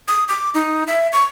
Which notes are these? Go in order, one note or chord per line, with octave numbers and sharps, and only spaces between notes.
D#6
D6
D#4
E5
C#6